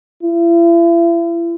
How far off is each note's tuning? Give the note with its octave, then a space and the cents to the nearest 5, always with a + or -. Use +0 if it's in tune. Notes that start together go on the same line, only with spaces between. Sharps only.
E4 +40